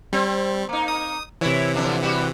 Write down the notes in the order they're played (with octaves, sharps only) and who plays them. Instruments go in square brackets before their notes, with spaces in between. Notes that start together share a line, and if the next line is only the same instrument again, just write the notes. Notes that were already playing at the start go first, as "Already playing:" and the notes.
[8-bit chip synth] G3 [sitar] C4
[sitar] A#3 D#4
[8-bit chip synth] D#6
[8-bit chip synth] C3 E3 [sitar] E4 C#5
[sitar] F2 D3 D4
G3 F#4 G4